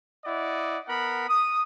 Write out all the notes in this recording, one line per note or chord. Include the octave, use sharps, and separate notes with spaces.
E4 D5 D#5 F#5
B3 A#4 F#5 B5
D#6